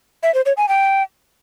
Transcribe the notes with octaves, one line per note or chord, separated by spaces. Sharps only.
E5
C5
C#5
G#5
G5